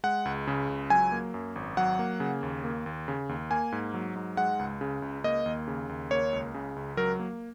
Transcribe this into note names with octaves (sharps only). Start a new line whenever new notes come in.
G#3 F#5
C#2
C#3
C#2
F#3 G#5
A#3
F#2
G#1
F#3 F#5
A#3
C#3
D#2
A#3
D#2
C#3
D#2
A#3 G#5
G#2
F#3
G#2
G#3 F#5
C#2
C#3
C#2
A#3 D#5
D#2
C#3
D#2
A#3 C#5
C#2
C#3
C#2
F#3 A#4
A#3